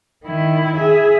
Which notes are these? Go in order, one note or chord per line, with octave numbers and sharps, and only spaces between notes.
D#3 E4
G#4 E5